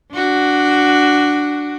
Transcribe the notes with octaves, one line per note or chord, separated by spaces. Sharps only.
D4 F#4